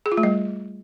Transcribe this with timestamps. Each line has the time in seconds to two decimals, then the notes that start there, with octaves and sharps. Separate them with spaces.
0.06 G#4
0.12 F4
0.17 A3
0.23 G3